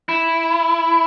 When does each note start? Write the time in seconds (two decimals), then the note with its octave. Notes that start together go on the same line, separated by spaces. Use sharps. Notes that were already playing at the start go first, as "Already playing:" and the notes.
0.09 E4